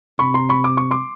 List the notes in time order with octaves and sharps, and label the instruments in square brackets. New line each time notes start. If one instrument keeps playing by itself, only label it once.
[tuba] C3 [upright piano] B5 C#6
[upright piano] A#5 C6
B5 C#6
D6
C#6
C6 D6